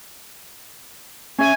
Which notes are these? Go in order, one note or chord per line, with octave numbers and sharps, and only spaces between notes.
C#4 E5 G#5